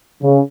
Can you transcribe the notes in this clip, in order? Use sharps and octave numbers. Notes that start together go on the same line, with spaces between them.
C#3